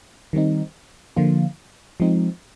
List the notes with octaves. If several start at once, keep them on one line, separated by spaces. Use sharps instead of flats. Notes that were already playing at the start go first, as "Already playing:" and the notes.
D#3 G3 C4 D#4
D3 F3 A#3 F4
F3 G#3 C4 D#4